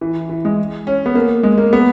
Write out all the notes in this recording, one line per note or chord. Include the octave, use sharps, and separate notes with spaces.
E3
E3
G#3
C#4
B3
A#3
G#3
A#3
B3